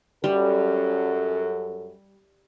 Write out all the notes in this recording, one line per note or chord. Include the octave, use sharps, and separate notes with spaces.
F#2 G3 A4